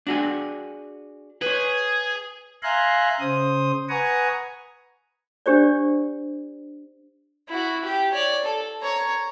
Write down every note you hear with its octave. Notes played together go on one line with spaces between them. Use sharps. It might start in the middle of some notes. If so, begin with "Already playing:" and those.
D4 F#4 G#4
G#4 B4 C#5
E5 F5 G#5 A#5 C6 F#6
C#3 C5 D#6
B4 F#5 G#5 A#5 C#6 D#6
D4 G4 C5 D5
E4 F#4
G4
C#5 D5
A4
C#5 A#5